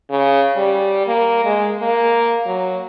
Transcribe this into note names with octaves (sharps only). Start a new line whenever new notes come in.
C#3
G3
A#3
G#3
A#3
F#3